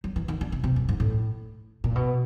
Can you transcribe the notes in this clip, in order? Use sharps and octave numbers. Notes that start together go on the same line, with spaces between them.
F#3
E3
D#3
D3
C#3
C3
F#2
G#2
A2
A#2
B2